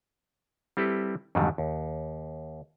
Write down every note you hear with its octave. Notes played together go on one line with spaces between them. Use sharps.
G3 C4 E4 G4 A4 B4
F2 G#2 D3 D#3 F#3 G3
D#2